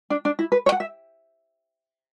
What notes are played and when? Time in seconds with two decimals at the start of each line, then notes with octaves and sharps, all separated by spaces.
0.10 D4
0.25 D4
0.39 E4
0.52 B4
0.66 C#5
0.72 F#5
0.80 E5